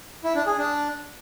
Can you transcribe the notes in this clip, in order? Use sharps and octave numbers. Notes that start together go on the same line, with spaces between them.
E4
D4
G#4
D4